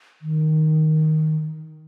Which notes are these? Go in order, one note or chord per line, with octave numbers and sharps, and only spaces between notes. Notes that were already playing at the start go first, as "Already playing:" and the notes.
D#3